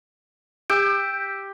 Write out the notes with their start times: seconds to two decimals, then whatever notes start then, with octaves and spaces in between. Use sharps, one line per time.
0.70 G4 E6 G6 D7